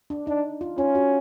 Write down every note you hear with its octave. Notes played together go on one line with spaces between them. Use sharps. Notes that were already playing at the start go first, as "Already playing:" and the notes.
D4
D4 D#4
F4
C#4 F4
F#4